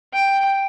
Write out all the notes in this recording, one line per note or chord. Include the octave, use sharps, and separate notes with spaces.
G5